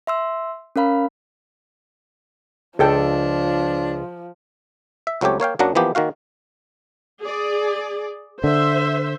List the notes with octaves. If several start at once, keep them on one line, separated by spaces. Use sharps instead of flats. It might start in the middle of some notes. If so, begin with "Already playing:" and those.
E5 C6 E6
C#4 A#4 F5 B5
C#2 F3 D4 G#4 A4 G5
E5
C#2 F#3 A3 C4 G4 C#5
A#3 C#5 F5 G5
F#2 F#3 A#3 D4 F#5 A#5
E3 F3 A#3 B3 G4
D#3 A#3 F#4 F5
G#4 D5
D3 C5 E5